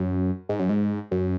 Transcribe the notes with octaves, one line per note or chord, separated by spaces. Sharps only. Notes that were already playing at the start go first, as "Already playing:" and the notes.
Already playing: F#2
G#2
F#2
G#2
F#2